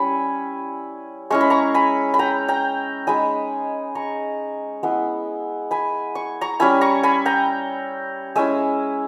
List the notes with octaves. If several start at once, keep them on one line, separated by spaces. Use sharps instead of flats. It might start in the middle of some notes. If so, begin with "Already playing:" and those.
Already playing: G3 C#4 E4 G#5 B5 C#6
G#3 C#4 E4 C#6
B5
A#5 C#6
G#5 B5
B5
G5 A#5
G5 A#5
G#3 D#4 G#5 B5
A#5 C#6
G#3 B3 E4
G#5 B5
C#6
A#5 C#6
G3 C#4 E4 G#5 B5
A#5 C#6
G#5 B5
G5 A#5
G#3 C#4 E4 E5 G#5